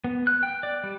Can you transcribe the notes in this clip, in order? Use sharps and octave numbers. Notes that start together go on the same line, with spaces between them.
B3
F#6
G5
D5
G3